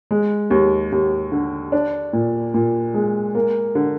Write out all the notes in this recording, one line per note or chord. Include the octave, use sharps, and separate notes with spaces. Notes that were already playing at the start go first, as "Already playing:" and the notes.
G#3
D#2
D#2
D3
D4
A#2
A#2
G#3
A#3
D3